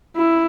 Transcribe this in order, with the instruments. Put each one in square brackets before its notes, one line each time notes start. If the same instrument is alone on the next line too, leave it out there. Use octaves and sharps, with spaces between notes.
[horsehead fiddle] E4